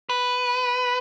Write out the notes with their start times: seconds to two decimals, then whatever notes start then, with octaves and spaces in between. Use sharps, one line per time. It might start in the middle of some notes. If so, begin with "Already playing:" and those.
0.10 B4